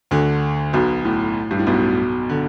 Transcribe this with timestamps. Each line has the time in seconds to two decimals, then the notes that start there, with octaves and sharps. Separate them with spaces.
0.11 D2 D3
0.73 B1 B2
1.05 A2
1.51 G2
1.59 A2
1.67 B1 B2
2.29 D3